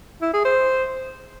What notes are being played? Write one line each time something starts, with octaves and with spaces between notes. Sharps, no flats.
E4
G#4
C5